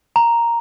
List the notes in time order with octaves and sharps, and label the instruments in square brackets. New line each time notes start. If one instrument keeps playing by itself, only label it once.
[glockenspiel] A#5